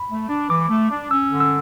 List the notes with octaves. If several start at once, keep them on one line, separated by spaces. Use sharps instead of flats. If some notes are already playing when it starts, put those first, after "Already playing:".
Already playing: B5
A3
D4
E3 D6
A3
D4
C#4 E6
D3
E6